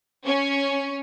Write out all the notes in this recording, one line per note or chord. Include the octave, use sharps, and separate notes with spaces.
C#4